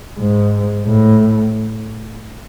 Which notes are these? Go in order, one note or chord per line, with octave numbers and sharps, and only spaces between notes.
G#2
A2